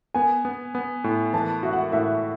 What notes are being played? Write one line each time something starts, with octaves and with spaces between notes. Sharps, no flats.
B3 G#5
B3
B3
A2
E3 A5
F#4 E5
F#5
A2 E5